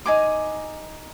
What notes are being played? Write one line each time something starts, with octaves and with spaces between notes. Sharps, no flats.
D#4 G#5 D6